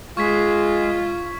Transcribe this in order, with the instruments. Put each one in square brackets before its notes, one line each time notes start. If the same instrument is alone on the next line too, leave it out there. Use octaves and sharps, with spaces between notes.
[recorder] G#3 [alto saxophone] F4 [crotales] C#6 G#6 B6